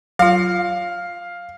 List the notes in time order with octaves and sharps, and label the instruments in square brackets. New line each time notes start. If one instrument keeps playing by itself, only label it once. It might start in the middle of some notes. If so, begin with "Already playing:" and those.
[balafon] F#3 F4 [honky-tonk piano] F5